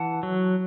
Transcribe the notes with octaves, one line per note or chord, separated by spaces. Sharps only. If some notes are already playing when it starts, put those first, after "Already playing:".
Already playing: E3 F#5 A5
F#3